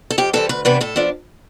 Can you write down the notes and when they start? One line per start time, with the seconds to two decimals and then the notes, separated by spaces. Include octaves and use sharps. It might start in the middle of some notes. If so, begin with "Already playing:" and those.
0.10 A4
0.18 F2 G4
0.33 E3 G3 C4 A4
0.49 D2 B4
0.65 C3 E3 B3 D4 B4
0.81 A2 A4
0.96 F3 B3 D4